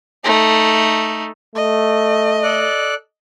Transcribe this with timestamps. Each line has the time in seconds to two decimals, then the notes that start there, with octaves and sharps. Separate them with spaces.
0.24 A3 D#4
1.55 A3 D#5
2.43 A4 D5 F#6